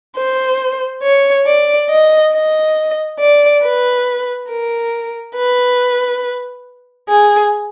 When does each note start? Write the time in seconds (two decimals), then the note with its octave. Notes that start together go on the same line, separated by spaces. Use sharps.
0.17 C5
1.03 C#5
1.47 D5
1.90 D#5
2.33 D#5
3.19 D5
3.63 B4
4.49 A#4
5.36 B4
7.09 G#4